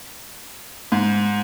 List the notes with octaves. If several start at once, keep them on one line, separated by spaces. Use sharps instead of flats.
G#2